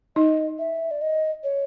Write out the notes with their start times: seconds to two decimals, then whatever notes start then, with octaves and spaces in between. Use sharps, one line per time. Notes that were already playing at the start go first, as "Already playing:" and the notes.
0.16 D#4 D#5
0.59 E5
0.91 D5
1.01 D#5
1.44 C#5